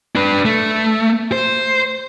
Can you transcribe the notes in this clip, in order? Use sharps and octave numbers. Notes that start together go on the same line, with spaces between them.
D4 B4
A3
C5